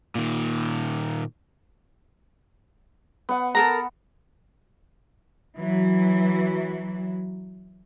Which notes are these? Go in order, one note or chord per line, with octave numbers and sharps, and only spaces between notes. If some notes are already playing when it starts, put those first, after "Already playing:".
A#2 D#3
B3 F#5
A4 A#4 A#5
E3 F#3